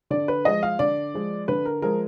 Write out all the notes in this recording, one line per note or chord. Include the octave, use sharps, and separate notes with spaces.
D3 D5
B4
F3 G#3 D#5
F5
D3 D5
F3 G#3
D3 B4
A#4
F3 G#3 A#4